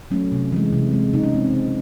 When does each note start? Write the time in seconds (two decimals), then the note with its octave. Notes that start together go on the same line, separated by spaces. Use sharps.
0.11 F#3 A3 C#4
0.32 C3
0.52 E3 G#3
0.73 C3
0.93 E3 G#3
1.13 C#3 D#4
1.23 C#4
1.34 G#3 C4
1.45 C4
1.54 C#3